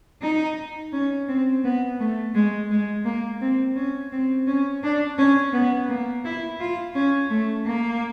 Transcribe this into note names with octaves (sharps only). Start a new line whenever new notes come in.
D#4
C#4
C4
B3
A3
G#3
G#3
A#3
C4
C#4
C4
C#4
D4
C#4
B3
A#3
E4
F4
C#4
A3
A#3